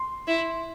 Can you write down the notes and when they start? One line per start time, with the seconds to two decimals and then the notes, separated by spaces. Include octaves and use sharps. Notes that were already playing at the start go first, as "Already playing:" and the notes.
Already playing: C6
0.28 E4